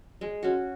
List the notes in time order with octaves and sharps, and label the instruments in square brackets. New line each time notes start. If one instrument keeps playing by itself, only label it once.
[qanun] G#3
C#4 F#4